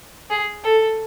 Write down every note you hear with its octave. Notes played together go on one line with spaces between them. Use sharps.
G#4
A4